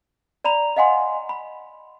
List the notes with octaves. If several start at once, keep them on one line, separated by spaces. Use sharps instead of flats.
D5 A#5 B5 F7
D#5 F5 F#5 G#5 C6
B5